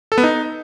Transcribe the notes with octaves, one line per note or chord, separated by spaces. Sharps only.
A4
B3
D#4